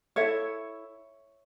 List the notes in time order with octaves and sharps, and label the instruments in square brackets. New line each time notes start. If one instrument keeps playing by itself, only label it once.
[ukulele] E4 A4 C#5 E5